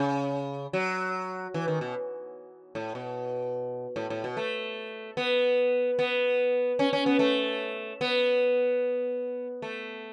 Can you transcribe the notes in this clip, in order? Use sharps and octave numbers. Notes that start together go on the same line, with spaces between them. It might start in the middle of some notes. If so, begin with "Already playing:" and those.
Already playing: C#3
F#3
E3
D#3
B2
A2
B2
A2
A2
B2
A3
B3
B3
C#4
C#4
B3
A3
B3
A3